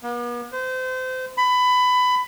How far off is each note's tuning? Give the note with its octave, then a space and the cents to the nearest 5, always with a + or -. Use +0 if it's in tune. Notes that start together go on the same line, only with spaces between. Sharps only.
B3 -45
C5 -30
B5 +20